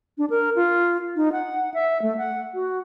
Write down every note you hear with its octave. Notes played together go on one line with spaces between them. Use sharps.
D4
A#4
F4
D#4
F#5
E5
A3
F#5
F#4